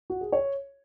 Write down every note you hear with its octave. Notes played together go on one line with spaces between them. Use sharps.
F#4
G#4
C#5